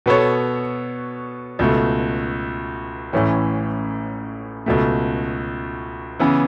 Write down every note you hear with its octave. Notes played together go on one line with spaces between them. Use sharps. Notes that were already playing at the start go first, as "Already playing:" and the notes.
B2 B3 A4 C#5
C#2 B2 A3
A1 A2 E3 C#4
C#2 B2 A3
C#3 E3 B3 E4